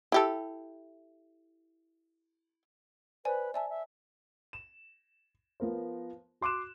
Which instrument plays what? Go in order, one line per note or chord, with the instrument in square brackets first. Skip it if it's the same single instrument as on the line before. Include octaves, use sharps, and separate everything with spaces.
[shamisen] E4 G4 A4
[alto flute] B4 [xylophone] C5 D5 G#5
[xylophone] D5 G#5 A5 [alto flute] E5
[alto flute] E5
[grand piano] E7
F3 B3 A#4 C5
F#4 C6 D6 F#6 E7